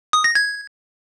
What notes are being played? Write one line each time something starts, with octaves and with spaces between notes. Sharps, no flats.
D#6
A#6
G#6